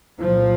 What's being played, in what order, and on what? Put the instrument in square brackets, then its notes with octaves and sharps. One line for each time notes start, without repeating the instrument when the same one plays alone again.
[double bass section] C2 A#2 F3